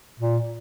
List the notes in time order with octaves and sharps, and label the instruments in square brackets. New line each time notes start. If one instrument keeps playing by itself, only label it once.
[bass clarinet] A#2